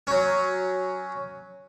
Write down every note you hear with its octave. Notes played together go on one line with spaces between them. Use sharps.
F#3 C#4